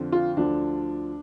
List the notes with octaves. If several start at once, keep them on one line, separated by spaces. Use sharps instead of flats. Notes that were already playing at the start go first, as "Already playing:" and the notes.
Already playing: F2 D3 F3
F4
D2 D3 F3 D4